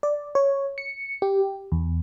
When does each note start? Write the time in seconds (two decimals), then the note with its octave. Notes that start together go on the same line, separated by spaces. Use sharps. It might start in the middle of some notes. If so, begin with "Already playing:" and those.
0.03 D5
0.35 C#5
0.78 C#7
1.22 G4
1.72 E2